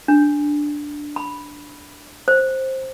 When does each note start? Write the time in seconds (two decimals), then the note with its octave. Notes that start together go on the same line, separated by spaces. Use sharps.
0.08 D4
1.16 B5
2.28 C5